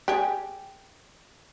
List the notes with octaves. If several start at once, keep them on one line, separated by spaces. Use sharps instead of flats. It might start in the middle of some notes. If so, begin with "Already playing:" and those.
G4 G#4